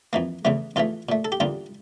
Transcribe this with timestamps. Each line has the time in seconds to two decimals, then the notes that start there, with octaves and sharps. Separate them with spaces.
0.13 F2 E3 A#3
0.45 E2 C#3 E3 A3
0.76 E2 E3 A3 F4
1.09 A#2 A3
1.25 A4
1.32 G4
1.40 E2 D3 G3 A#3 F4